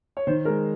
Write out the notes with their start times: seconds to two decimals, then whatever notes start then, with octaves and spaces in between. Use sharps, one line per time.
0.17 C#5
0.27 D#3 C5
0.45 G#3 A#4